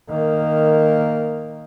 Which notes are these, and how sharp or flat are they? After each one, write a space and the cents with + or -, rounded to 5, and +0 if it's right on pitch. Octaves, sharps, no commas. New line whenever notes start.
D#3 -5 A#3 -10